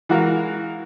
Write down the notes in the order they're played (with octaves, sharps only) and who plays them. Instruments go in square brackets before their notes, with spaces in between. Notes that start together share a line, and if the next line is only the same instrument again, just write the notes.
[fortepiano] E3 G#3 F#4 A#4 F5